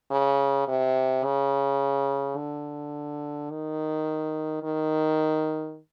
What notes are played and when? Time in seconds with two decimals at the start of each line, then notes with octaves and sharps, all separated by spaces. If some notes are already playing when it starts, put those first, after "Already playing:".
0.11 C#3
0.68 C3
1.24 C#3
2.37 D3
3.50 D#3
4.63 D#3